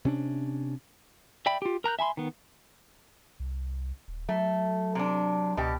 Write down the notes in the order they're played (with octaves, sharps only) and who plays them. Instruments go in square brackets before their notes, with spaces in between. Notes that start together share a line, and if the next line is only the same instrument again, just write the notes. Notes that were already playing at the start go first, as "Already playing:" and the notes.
[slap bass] C3 C#4 D4
[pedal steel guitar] D5 E5 G5 B5
F4 G4
A#4 A#5 F#6 G6
E5 G#5 B5 C6
D#3 B3
[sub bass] C2
D#1
[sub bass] F#3 [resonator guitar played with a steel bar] A3
[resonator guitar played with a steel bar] C3 D4
[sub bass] C#2 [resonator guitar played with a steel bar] B2 G4